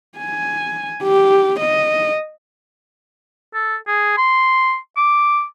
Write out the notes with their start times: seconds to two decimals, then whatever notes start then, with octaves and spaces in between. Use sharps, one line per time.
0.19 G#5
1.03 G4
1.60 D#5
3.54 A4
3.88 G#4
4.17 C6
4.97 D6